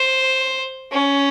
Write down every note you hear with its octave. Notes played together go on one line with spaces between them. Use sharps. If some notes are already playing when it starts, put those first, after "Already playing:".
Already playing: C5
C#4